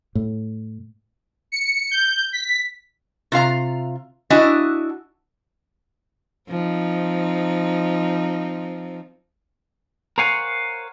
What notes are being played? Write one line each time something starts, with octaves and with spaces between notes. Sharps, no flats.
A2
C#7
G6
B6
C3 F4 F5 A#5
D4 E4 F#4 D#5 G#5
F3 C4 D#4
A#4 C5 C#5 F5 F#5 G#5